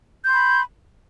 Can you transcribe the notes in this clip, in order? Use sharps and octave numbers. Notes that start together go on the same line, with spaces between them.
B5 C6 G6